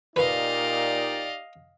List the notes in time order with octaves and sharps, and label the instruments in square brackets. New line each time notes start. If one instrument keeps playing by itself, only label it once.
[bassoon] A#2 [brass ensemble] D#4 G4 D5 [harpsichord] B4 [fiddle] D#5 F5